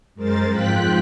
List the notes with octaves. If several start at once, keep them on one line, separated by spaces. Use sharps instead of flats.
F#2 G#3 A#4 C5 A6
F2 G#2 F4 G5 F#6 B6